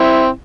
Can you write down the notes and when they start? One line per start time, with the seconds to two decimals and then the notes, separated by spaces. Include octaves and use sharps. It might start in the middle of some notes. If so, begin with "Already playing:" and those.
Already playing: C4 E4